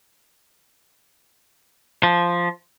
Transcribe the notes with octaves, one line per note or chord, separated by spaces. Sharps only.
F3